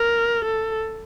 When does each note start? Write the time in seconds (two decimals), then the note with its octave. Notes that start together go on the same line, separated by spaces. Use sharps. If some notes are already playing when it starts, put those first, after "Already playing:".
Already playing: A#4
0.45 A4